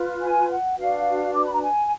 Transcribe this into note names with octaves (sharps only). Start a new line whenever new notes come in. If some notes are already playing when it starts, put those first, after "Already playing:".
Already playing: F4 B4
G#5
F#5
D4 F#4 B4 F5
D6
B5
A#5
G#5